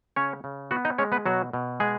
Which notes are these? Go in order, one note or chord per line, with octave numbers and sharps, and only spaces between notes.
C#3 C#4 C#5
C#3
B3 F#4 F#5
D#4 D#5
G#3 C#4 C#5
B3 B4
B2 F#3 F#4
B2
G#3 B3 G#4